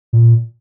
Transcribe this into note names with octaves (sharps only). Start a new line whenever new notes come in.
A#2